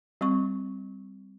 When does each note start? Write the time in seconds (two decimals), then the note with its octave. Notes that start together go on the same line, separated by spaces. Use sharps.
0.21 G3 C4 C#6